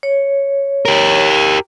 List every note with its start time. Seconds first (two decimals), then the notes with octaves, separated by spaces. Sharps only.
0.03 C#5
0.85 G4 A#4